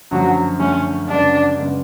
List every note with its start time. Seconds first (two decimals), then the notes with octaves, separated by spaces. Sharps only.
0.11 F#2 D3 F3 F#3 A3
0.59 F#2 D3 F3 A3 C#4
1.08 F#2 C#3 G#3 B3 D4
1.57 F#2 C#3 G#3 B3